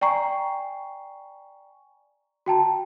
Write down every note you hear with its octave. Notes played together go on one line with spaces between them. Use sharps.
D5 G5 G#5 A#5 C#6 C7
F#4 G5 A5 A#5